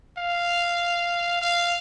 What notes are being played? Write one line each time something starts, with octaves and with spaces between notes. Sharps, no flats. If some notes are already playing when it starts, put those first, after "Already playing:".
F5
F5